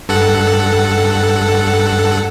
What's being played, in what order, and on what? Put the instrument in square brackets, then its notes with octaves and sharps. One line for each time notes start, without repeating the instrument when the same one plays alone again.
[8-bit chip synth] G2 A4 F#5